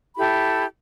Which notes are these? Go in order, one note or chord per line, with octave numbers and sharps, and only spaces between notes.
E4 G4 A4 B5